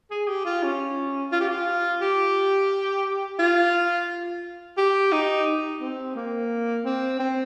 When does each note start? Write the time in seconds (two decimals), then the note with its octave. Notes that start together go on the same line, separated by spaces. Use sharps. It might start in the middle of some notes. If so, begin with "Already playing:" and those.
0.10 G#4
0.28 G4
0.45 F4
0.63 C#4
1.32 F4
1.40 G4
1.48 F4
2.01 G4
3.39 F4
4.77 G4
5.12 D#4
5.81 C4
6.15 A#3
6.85 C4
7.19 C4